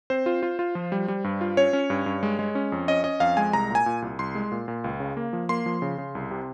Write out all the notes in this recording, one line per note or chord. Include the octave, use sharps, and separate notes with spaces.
C4 C5
F4
F4
F4
F3
G3
G3
G2
F4
C#4 C#5
C#4
G2
G2
G#3
G#3
C#4
F2
C#4 D#5
C#4 D#5
F2 F5
G#3 G#5
C2 A#5
A#2 G#5
A#2
C2
C2 C6
G#3
A#2
A#2
C#2
C#3
A#3
F3
A#3 C6
F3
C#3
C#3
C2
C3